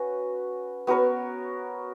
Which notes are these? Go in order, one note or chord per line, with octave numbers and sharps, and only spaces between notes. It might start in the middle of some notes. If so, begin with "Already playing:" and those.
Already playing: C#4 F#4 B4
B3 F#4 A#4 C#5